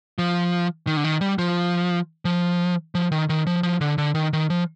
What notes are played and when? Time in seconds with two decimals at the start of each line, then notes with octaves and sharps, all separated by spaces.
0.18 F3
0.87 D#3
0.97 D3
1.04 D#3
1.21 G3
1.38 F3
2.25 F3
2.95 F3
3.12 D#3
3.29 D#3
3.47 F3
3.63 F3
3.81 D3
3.98 D3
4.15 D#3
4.33 D#3
4.50 F3